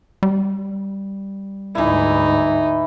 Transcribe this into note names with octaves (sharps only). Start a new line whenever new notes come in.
G3
D2 G#2 E3 D#4 E4